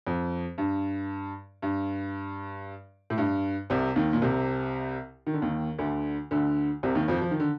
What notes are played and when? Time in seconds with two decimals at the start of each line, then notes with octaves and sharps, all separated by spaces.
0.07 F2
0.58 G2
1.62 G2
3.10 A2
3.18 G2
3.70 C2 C3
3.96 D#2 D#3
4.13 A#2
4.22 C2 C3
5.27 D#3
5.34 D3
5.42 D#2 D#3
5.78 D2 D3
6.31 D2 D3
6.83 C2 C3
6.95 D#2 D#3
7.08 F2 F3
7.22 F3
7.31 D#3
7.40 D3